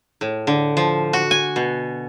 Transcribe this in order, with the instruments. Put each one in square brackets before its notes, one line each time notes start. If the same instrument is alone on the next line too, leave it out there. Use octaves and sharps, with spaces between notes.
[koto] A2
D3
F3
F#4
G#5
B2